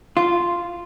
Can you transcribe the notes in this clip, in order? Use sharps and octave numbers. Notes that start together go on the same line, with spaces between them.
F4